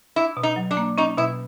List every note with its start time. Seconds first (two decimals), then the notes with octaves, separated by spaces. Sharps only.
0.16 D4 E4
0.37 B2
0.43 D#4
0.56 F#3
0.71 D4
0.77 A#3
0.98 C#4 D#4
1.17 B2 E4